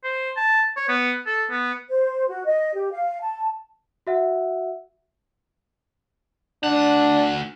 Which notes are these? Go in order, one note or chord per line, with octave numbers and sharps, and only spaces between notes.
C5
A5
C#5
B3
A4
B3
C5
F#4
D#5
G4
F5
A5
F#4 E5 F#5
D2 D4 F#5